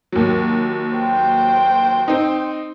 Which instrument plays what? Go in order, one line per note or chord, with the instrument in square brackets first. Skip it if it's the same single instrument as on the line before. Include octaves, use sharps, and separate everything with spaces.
[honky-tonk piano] D#2 F#3
[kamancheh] C5 G5
[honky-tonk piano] C4 D#4